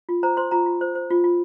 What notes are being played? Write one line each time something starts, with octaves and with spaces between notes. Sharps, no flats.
F4
C5 A#5
C5 C6
F4 A#5
F4
C5
C5
F4
F4